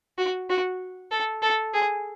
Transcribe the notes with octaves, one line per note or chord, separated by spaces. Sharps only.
F#4
F#4
A4
A4
G#4